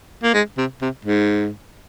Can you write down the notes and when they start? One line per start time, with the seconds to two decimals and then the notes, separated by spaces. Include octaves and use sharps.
0.23 A#3
0.34 G#3
0.58 C3
0.82 C3
1.05 G#2